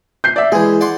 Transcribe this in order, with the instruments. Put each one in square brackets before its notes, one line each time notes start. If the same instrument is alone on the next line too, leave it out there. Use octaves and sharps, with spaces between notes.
[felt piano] G6 C7
D5 E5
[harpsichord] E3 G#3 [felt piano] G#4
[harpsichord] D5 F#5 C6